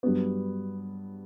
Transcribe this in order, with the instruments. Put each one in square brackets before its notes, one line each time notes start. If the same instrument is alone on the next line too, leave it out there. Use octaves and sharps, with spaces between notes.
[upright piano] G2 F#3 B3